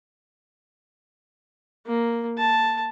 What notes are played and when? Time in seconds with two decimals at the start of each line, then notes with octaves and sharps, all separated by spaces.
1.87 A#3
2.38 A5